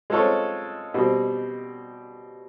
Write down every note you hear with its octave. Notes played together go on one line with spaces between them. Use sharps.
G#3 C4 F4 A4 C#5
B2 G3 C4